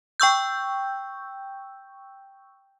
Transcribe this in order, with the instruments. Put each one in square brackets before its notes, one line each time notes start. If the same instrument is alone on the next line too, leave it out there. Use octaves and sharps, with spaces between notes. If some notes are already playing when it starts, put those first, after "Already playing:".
[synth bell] G5 C#6 E6 G6